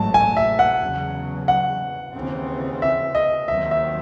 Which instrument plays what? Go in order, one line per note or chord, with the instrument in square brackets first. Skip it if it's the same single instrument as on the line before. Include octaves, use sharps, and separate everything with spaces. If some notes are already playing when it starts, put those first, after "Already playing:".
Already playing: [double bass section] A1 G#2 F#3 A3 [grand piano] A5
[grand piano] G#5
E5
F#5
[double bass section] E2 C#3 F#3
[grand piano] F#5
[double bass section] D#2 C#3 E3 C4
[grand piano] E5
D#5
[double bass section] D#2 D#3 F#3 C4 [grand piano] E5
[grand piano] E5